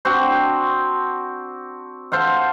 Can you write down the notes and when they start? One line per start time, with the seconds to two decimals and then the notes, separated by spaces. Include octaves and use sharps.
0.05 C4 D4 F#4 C5
2.12 A4 C5 F5 F#5